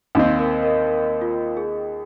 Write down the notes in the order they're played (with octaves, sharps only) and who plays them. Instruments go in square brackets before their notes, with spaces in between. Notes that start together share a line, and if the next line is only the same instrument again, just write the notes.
[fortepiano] D#2 D#3 C4 [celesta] C5 F5
[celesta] A#4 D#5
A#4 D#5
A#4
F4
G#4